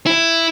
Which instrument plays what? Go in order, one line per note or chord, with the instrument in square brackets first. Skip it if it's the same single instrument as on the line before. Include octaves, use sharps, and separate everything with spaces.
[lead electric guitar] E4